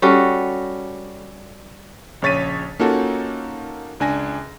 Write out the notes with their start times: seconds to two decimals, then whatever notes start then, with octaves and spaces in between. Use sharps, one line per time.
0.02 G3 C#4 F#4 A4
2.22 A#1 C#3 C#5 A6 B6 D#7
2.79 A#3 C#4 D#4 F4 F#4 A4
4.00 C#2 D4 G#5 A#6